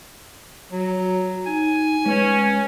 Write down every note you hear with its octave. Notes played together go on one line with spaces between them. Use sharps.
F#3 F#4
D#4 G#5
G#3 C#4 B4